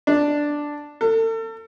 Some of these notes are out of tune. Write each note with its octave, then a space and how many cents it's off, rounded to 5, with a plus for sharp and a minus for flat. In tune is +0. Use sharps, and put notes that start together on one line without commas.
D4 +0
A4 +40